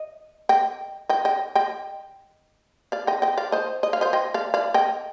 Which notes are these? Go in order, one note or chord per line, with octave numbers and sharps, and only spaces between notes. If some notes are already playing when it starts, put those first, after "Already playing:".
Already playing: D#5
D#5 G5
D#5 G5
D#5 G5
D#5 G5
D5 F5
D#5 G5
D#5 G5
D5 F5
C5 D#5
D#5
F5
C5 D#5
D#5 G5
D5 F5
D5 F5
D#5 G5